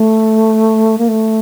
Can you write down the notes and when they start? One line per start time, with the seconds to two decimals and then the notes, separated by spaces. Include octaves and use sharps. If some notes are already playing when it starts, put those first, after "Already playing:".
Already playing: A3
0.98 A#3
1.08 A3